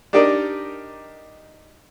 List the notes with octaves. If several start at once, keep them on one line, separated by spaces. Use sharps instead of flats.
D4 D#4 G4 A#4 D5 D#5